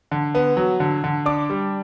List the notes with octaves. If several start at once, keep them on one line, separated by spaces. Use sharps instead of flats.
D3
B3
F#3
D3
D3
D4 D6
G3